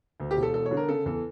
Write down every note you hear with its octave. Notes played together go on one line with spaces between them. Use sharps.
D2
G4
E1
A4
E1 A4
C#5
D3
A#4
C#3 A4
E2 A4